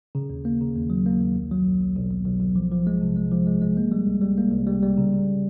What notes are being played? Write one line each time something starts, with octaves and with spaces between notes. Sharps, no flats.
C#3
D#2
A#3
C#3
D#2
F#3
A#3
D#2
B1
F#3
B1
B1
B1
B1
B1
B1
F3
F3
G#3
C3
G#3
F3
G#3
G#3
A#3
G3
C2
G3
A#3
C2
G3
G3
C#3
C#3